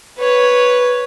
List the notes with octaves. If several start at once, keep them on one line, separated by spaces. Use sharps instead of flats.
B4 C#5